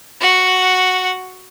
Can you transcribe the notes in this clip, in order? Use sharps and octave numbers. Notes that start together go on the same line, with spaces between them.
F#4 F#5